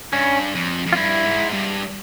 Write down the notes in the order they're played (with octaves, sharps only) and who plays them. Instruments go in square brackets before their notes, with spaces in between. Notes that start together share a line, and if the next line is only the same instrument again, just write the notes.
[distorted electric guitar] G2 [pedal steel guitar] C#4
[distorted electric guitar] F2
F2
[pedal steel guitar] F4
[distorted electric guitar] G2 [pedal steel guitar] E4
[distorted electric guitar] G#2
G2